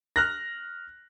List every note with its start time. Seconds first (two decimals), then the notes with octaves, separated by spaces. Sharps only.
0.16 F6 F#6 A#6